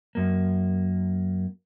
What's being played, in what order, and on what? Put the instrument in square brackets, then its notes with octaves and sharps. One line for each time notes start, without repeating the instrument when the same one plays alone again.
[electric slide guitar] F#2 A#3